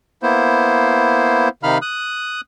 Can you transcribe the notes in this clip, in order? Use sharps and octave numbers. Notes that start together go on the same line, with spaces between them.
A#3 B3 E4 C5
C3 D#3 D#4 F5 B5 F6
D#6 F#6